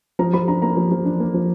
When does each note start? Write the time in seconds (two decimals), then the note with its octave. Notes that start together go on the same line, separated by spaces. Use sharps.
0.19 F3 A#5
0.34 F3 B5
0.48 D4 A#5
0.62 A#3 A#5
0.77 F3
0.91 F3
1.05 D4
1.20 A#3
1.34 F3